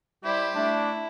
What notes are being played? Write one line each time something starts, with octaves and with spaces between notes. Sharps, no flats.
G3 E4 G4 C5
A3 D4 E4